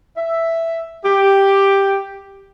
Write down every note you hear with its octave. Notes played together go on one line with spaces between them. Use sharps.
E5
G4